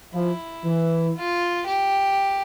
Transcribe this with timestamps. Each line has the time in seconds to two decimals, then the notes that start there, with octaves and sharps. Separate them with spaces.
0.14 F3 E4
0.65 E3
1.16 F4
1.67 G4